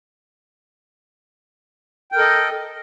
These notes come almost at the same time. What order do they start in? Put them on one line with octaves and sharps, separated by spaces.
G5 A#4 A4 D#5